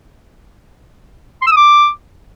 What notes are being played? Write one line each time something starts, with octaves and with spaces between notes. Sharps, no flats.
C6
E6
D#6
D6